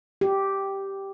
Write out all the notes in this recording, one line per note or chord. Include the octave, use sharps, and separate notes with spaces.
G4